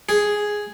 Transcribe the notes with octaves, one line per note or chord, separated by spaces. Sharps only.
G#4